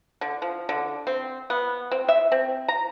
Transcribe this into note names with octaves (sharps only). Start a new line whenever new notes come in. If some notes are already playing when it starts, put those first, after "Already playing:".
D3
F3
D3
C4
B3
C4
E5
C4
A#5